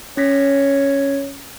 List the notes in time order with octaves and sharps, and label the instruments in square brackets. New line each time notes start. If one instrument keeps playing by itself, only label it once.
[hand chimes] C#4 A#6 B6 [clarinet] C#5